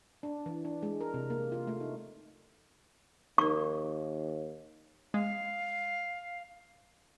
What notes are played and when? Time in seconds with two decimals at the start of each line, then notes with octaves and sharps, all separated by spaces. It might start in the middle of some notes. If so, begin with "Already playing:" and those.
0.23 D4
0.46 E3
0.65 D4
0.83 G#3
1.01 A#4
1.14 C3
1.30 A#3
1.52 F4
1.67 A3
1.80 D#4
3.38 D#2 D#4 A#4 C#6
5.14 G#3 F5